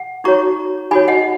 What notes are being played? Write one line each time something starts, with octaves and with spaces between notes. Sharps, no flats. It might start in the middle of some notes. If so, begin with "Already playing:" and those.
Already playing: F#5
D#4 F#4 C#5 A#5 C#6
D#4 F#4 C#5 G#5 B5
D#5 F#5